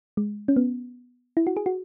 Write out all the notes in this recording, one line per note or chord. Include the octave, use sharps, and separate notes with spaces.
G#3
C#4
B3
E4
F#4
G#4
F#4